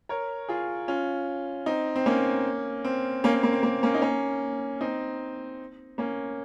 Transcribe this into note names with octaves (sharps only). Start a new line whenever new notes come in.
A#4 C#5
F4 G#4
C#4 F4
C4 D#4
C4
A#3 C#4
C4
A#3 C#4
C4
A#3
C4
A#3
A#3 C#4
D#4
A#3 C#4
C4 D#4
A#3 C#4